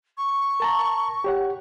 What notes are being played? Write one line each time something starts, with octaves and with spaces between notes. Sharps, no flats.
C#6
A#4 A5 A#5
G4 C#5 F#5